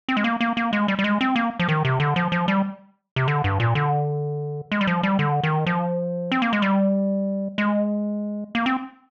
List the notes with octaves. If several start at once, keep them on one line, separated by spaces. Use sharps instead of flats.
C4
G#3
A#3
A#3
A#3
G#3
G3
G3
G#3
C4
A#3
F3
D#3
C3
D3
F3
F3
G3
C3
D3
G2
A#2
D3
G#3
G3
F3
G3
D3
D#3
F3
C4
A#3
G#3
G3
G#3
A#3
C4